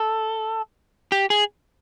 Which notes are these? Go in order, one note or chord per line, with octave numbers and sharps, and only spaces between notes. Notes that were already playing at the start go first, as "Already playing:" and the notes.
Already playing: A4
G4
G#4